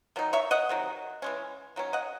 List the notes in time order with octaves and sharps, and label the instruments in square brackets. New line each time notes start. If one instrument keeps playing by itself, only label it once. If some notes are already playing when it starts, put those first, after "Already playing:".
[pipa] D#3 F#3 D#4
C#5 E5
D#5 F#5
C3 D#3 F#3
E3 G#3 C#4
D#3 F#3 C#4
D#5 F#5